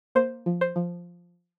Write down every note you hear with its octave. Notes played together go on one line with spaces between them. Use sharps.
A#3 C5
F3
C5
F3